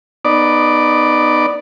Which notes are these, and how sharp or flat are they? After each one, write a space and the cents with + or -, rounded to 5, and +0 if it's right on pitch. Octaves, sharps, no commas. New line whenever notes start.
B3 +0 D#4 -20 D5 +0